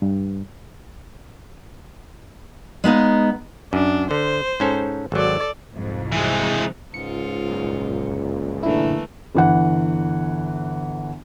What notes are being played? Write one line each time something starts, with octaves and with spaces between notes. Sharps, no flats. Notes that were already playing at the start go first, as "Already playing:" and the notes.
G2
G#3 B3 D#4 F5
F#2 D4
D3 C5
G#2 C#4 A4
G#1 F#3 A4 D5
C2 F2 G#2
E3 G#3
C#2 G#2 F4 C#7
G1 F#2 A#2
D3 E3 A3 A#3 E4
G1 E3 F#5